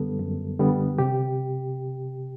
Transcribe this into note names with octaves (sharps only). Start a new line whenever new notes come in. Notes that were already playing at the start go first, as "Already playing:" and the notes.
Already playing: F#2 D3 G3 B3 A4
F#2
D3 G3 B3
C3 G4